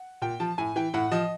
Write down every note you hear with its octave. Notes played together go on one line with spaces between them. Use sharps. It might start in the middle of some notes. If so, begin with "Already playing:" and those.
Already playing: F#5
A#2 G5
F3 A5
A2 G#5
E3 G5
A2 F#5
F3 D#5